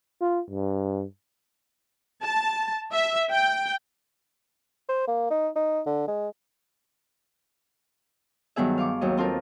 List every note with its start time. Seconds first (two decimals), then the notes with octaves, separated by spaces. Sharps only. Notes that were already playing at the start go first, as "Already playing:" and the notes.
0.21 F4
0.50 G2
2.23 A5
2.92 E5
3.32 G5
4.89 C5
5.07 A#3
5.31 D#4
5.56 D#4
5.86 D3
6.08 G#3
8.56 G2 D#3 F#3 B3 G#4 E5
8.78 F5 C#6 D6
9.01 D#2 F#3 D#5
9.17 C4 F4 A4 A#4